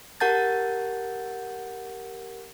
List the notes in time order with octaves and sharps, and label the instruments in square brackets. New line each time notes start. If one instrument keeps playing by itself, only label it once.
[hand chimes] G4 A#4 F#5 A5 G6 A6